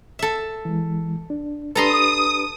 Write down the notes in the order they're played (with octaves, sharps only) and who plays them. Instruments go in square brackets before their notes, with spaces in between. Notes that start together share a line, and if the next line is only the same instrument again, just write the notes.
[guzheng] A4 E5
[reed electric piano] E3 G#3
D4
[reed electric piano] D4 G4 B4 [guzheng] A4 A#5 C6 [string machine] D#6